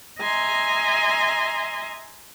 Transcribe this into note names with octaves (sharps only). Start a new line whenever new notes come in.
D#5 E5 G#5 A#5 C6